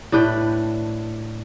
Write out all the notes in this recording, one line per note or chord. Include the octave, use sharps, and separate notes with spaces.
A2 D4 B4 G5